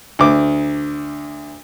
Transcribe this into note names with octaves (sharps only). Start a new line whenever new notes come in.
D2 D6